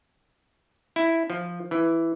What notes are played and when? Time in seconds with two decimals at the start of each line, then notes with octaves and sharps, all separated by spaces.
0.96 E4
1.30 F3
1.71 E3